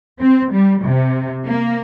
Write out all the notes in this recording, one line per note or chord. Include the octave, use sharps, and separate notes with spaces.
C4
G3
C3
A#3